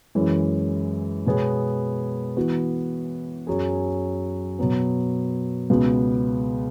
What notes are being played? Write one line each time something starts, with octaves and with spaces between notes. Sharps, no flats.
F#2 E3 G#3
B2 G#3 B3 G#4 C#5
E3 B3 F#4
F#2 F#3 C#4 G#4
B2 F#3 B3
C#2 B2 B3 F#4